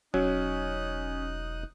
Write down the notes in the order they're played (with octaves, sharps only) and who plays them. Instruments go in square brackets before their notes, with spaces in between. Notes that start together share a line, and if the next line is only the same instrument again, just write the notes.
[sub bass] E1 [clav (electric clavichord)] F#3 [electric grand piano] C#4 [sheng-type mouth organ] D#4 D#6 F#6